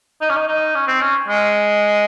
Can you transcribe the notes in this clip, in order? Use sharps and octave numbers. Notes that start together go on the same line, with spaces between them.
D#4
C#4
D#4
D#4
C#4
C4
C#4
G#3